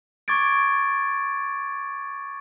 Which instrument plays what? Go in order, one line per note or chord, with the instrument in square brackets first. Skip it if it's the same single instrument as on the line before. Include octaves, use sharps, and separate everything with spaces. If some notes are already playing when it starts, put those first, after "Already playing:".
[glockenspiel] C#6 D6 G#6 A6 D7